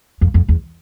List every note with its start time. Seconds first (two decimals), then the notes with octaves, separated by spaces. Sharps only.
0.21 F2
0.34 F2
0.48 E2